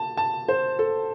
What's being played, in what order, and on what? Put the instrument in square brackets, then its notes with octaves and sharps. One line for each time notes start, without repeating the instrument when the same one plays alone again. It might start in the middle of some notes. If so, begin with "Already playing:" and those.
Already playing: [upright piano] A5
A5
C5
A4